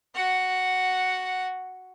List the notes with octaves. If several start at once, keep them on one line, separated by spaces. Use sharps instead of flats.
F#4 F#5